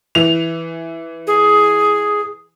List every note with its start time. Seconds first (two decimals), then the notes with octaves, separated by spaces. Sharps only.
0.15 E3 F7
1.27 G#4